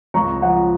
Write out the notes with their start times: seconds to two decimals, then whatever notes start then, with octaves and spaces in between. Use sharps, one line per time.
0.14 C#2 A#5 C#6
0.42 F3 F#5